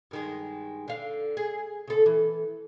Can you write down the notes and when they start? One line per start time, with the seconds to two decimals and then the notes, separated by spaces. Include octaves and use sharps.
0.11 G2 D#3 G#3
0.88 D3 F5
1.37 G#4
1.87 C#3 A4
2.06 E3